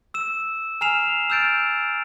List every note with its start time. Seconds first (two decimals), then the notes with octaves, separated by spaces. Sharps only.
0.14 E6 E7
0.81 G#5 A#5 F6 C7 E7 F7
1.30 E6 F6 G6 A6 D7